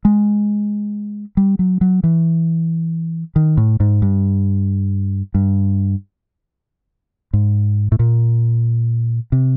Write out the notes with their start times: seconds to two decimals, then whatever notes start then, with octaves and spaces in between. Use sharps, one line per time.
0.05 G#3
1.37 G3
1.59 F#3
1.81 F#3
2.03 E3
3.36 D#3
3.57 A2
3.80 G#2
4.02 G2
5.34 G2
7.33 G#2
7.92 A2
7.99 A#2
9.32 C3